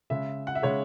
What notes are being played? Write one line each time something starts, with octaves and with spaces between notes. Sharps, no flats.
C#3 G#3 E5
F#5
E5
C#3 G#3 C#5